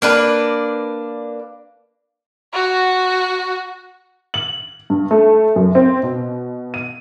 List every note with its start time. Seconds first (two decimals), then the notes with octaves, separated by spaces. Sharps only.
0.02 A#3 D4 B4
2.53 F#4
4.34 F#7
4.90 G2
5.11 A3
5.56 F#2
5.75 C4
6.03 B2
6.74 D#7